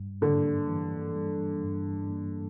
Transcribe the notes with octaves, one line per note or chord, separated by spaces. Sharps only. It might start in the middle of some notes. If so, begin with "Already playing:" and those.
Already playing: G2 G3
D3 A#3
E3
G3
G2
A#3